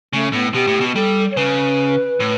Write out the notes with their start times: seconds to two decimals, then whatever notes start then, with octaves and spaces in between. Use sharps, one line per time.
0.13 C#3 A3
0.33 A2 B3
0.54 B2 G4
0.67 A2
0.81 B2
0.95 G3 A4
1.31 C#5
1.37 C#3 B4
2.20 A2